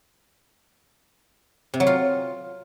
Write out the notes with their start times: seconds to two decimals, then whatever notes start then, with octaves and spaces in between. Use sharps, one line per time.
1.74 C3
1.80 F#3
1.87 F4